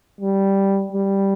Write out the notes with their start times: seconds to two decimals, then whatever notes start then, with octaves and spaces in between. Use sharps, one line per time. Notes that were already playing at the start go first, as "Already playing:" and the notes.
0.21 G3
0.92 G3